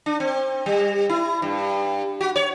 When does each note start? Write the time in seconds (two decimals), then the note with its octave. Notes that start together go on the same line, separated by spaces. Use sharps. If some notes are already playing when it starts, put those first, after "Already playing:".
0.06 D4
0.20 C4
0.66 G3
1.10 E4
1.42 G2
2.21 F#4
2.36 C#5